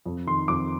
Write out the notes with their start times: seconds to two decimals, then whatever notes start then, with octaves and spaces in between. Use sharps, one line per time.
0.06 F2
0.27 D#3 C6
0.48 F2 D6